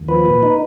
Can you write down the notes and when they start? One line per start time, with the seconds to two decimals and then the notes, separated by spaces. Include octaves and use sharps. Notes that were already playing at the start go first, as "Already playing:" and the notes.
Already playing: D#2
0.08 F3 B4
0.26 A#2
0.43 D#4